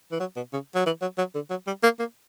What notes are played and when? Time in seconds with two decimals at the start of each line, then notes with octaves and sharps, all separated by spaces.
0.12 E3
0.20 F#3
0.36 B2
0.53 C#3
0.75 F#3
0.86 E3
1.02 F#3
1.18 F#3
1.35 D3
1.50 F#3
1.67 G3
1.83 A#3
1.99 A#3